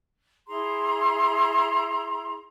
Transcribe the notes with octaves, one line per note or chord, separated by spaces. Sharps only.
E4 G#4 A#5 C6